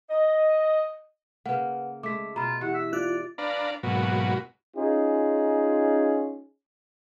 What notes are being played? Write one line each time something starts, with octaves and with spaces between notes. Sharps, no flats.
D#5
C#3 A#3 B4 F#5
G#3 A3 D6 B6
B2 F4 A#5 B5
E3 G4 F#5
E5
F4 D5 F#6
D4 B4 D5 F5 A#5
G#2 B2 F#3 A#3 F#4 B4
C#4 D#4 F4 G#4